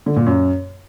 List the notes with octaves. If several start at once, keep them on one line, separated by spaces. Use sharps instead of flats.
D3
A#2
F#2